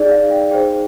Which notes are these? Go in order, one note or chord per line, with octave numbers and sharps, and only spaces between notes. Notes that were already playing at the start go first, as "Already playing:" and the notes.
Already playing: D#4 G#4 D5
F5
G5
D#4 G#4 C5 G5